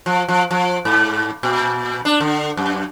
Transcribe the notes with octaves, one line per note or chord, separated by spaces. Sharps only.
F3
F3
F3
G#2
A#2
D4
D3
F#2